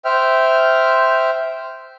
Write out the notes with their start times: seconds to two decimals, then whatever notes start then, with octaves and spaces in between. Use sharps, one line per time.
0.05 C5 E5 G5 F6